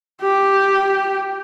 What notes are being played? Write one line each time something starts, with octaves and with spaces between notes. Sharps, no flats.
G4